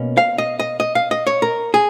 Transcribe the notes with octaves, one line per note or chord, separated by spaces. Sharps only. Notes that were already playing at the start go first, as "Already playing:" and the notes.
Already playing: B2 A#3 C#4
F5
D#5
D#5
D#5
F5
D#5
C#5
A#4
G#4